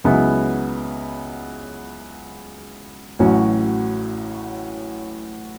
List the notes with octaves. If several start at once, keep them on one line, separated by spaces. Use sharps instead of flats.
C#2 C#3 F#3 B3 E4
A1 A2 F#3 C#4 F#4